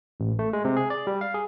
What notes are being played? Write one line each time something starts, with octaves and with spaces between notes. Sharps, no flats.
A1
A3
G#3
C3
G#4
D5
G3
F5
G#4